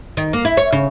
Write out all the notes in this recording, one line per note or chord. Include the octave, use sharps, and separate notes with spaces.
D#3
A#3
E4
C#5
C#3